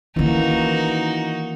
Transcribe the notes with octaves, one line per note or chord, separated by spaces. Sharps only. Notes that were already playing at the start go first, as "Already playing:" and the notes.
D#3 E3 A#3 C#4 D#4 F#4